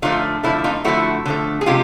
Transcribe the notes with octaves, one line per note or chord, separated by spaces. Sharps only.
D3 F3 A3 D#4 F4
D3 F3 A3 E4
D#4 F4
D3 F3 A3 E4 F#4
D3 F3 A3
G#4
C3 F3 G#3 F4 G4